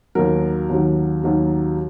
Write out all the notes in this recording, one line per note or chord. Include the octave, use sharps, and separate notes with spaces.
D#2 D#3 F#3 A#4
D#2 D#3 F#3
D#2 D#3 F#3